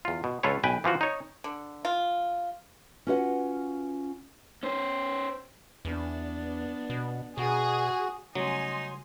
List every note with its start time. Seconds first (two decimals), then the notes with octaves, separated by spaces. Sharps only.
0.05 E2 F4
0.24 B2
0.43 C#2 F4 A4 B4 C#5
0.63 B1 B4 G5 G#5
0.84 E3 F3 F4 F#4
1.01 D#4 C#5
1.44 D3
1.85 F4
3.07 C#4 F4 F#4 B4 E5 F#5
4.63 C#4 C5
5.85 E2 B3 D4
6.90 B2
7.38 B2 F#4 G#4
8.35 C#3 F#3 G3 A3 D#4 G#5 C6